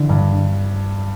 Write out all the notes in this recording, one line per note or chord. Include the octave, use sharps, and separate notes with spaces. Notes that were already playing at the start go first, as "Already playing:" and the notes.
Already playing: D3 E3
G2